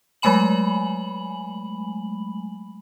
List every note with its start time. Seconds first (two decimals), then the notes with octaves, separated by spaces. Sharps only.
0.22 F#3 G#3 A3 G#5 B5 F#7